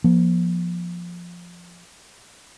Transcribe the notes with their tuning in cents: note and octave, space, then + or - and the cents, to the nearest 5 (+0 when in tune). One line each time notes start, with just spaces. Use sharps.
F3 +0 A#3 +40